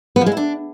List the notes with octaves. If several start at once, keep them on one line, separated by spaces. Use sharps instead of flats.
B3
F3
G#3
E4
D4